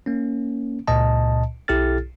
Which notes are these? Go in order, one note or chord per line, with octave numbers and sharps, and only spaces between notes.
A#3 C#4
C#2 A#2 D#5 A5
B1 E4 G4 A4 F6 A6